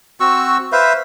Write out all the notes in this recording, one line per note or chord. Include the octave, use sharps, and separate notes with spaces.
C4 F#4 C#6 E6
B4 C5 E5 F5